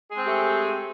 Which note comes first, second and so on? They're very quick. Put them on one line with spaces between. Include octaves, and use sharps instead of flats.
G#4 G#3 C4 G4 A3